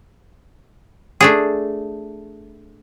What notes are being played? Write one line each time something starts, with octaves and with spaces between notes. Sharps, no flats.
A3 D4 G#4